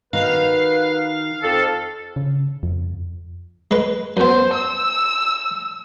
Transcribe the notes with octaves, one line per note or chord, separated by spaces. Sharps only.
D#3 D#4 F#4 B4 F5
F2 A4
C#3
F2
G#3 B4
F#2 B3 C5
E6